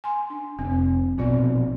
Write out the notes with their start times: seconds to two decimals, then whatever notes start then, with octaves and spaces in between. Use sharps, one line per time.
0.04 G#5 C6
0.30 D4
0.59 F1 C4
1.18 A#1 B2 C4 F4 D5